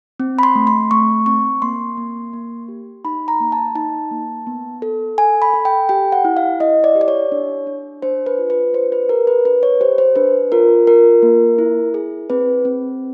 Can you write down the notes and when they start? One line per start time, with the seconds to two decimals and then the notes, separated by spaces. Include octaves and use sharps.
0.20 C4
0.39 B5
0.43 C6
0.55 A3
0.67 C6
0.91 A3 C#6
1.26 C4 C#6
1.62 A#3 C6
1.97 A#3
2.33 A#3
2.68 G4
3.05 D#4 B5
3.28 A#5
3.40 A#3
3.52 A5
3.75 D#4 A5
4.11 A#3
4.47 B3
4.82 A4
5.18 A4 G#5
5.42 B5
5.54 A4
5.65 G5
5.89 G4 G5
6.12 F#5
6.25 E4
6.37 F5
6.60 E4 D#5
6.84 D5
6.95 G4
7.01 D5
7.08 C#5
7.32 D4
7.67 D4
8.02 D4 C5
8.26 B4
8.39 F4
8.50 B4
8.73 D4 C5
8.92 B4
9.09 G4 A#4
9.27 B4
9.45 D4 B4
9.63 C#5
9.81 G4 C5
9.98 C5
10.16 D4 B4
10.52 F4 A#4
10.87 F4 A#4
11.23 A#3
11.58 E4
11.94 G#4
12.30 C4 B4
12.65 C4